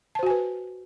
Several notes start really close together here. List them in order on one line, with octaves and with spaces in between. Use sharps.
A5 C5 F#4 G#5 B4